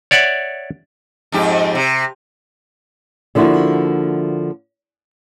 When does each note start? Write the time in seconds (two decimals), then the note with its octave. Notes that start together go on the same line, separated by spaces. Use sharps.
0.11 C#5 D5 E5 F#5
1.32 F2 G#2 G4
1.75 C3
3.35 D3 F3 A#3 E4 F#4